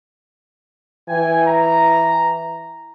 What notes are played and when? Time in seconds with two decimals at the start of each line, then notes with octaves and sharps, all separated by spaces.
1.09 E3 G5 G#5
1.47 A#5